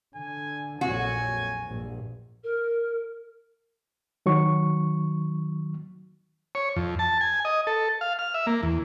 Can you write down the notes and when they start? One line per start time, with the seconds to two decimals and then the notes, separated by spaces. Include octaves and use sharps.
0.16 D3 G#5
0.81 A#1 F2 F#3 F#4 G#5
1.65 A#1 G2
2.43 A#4
4.26 D#3 F#3 C#6
6.55 C#5
6.76 F2
6.99 A5
7.21 G#5
7.45 D#5
7.67 A4
8.01 F5
8.19 F6
8.34 E5
8.47 A#3
8.63 E2